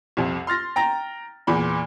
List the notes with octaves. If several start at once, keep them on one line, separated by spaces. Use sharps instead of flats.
C2 F2
C6 F6 A6 A#6
G5 A#5 A#6
E2 A#2 B5